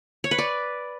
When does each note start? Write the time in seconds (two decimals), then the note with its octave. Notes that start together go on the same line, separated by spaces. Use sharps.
0.24 C#5
0.31 B4
0.38 D5